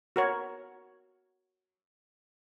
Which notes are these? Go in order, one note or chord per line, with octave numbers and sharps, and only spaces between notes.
F#4 A#4 C#5